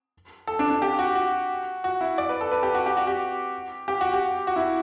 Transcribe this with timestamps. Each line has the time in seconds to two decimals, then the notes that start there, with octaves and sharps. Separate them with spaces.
0.47 A4
0.59 D4
0.70 D4
0.82 G4
0.99 F#4
1.15 F#4
1.84 F#4
2.01 E4
2.18 D5
2.29 B4
2.41 A4
2.52 B4
2.63 G4
2.74 F#4
2.86 G4
2.97 F#4
3.07 G4
3.88 G4
4.01 F#4
4.14 G4
4.47 F#4
4.56 E4